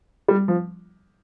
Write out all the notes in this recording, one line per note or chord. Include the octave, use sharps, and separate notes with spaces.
G3
F3